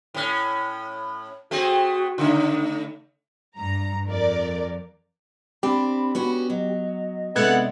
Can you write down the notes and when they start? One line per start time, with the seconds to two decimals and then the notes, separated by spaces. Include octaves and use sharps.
0.14 A2 C#4
1.51 A3 C4 F#4 G#4
2.18 C#3 A3 D#4
3.57 G2 A#5
4.07 F2 A#4 D5
5.63 C4 D4 G4 B5
6.15 B3 C#4 F#4
6.50 F#3 D#5
7.36 C3 G#3 B3 D4 A4 F#5 G#6